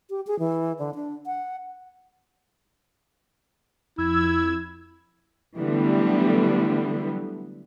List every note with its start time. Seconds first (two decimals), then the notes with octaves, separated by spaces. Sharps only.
0.10 G4
0.27 G#4
0.39 E3
0.79 D3
0.95 D4
1.26 F#5
3.98 F2 E4 E6 G#6
5.58 D3 E3 F#3 G3 A3 B3